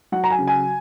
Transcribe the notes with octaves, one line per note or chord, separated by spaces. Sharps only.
F#3 F#5
A#5
G#5
C#3
G#5